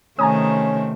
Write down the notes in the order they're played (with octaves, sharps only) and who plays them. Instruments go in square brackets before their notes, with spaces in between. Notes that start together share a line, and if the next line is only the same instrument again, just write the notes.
[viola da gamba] C3 D#3 A3 [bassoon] C#4 [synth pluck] G#5 A#5 D#6